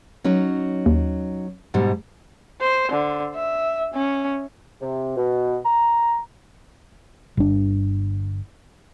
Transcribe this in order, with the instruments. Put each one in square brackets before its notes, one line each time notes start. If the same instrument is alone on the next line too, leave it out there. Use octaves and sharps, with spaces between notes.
[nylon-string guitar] F#3 C#4 D#4
[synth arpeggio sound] D#2
[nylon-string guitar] G#2 B2 G3
[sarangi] C5
D3
E5
C#4
[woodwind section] C3
B2
A#5
[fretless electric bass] G1 D4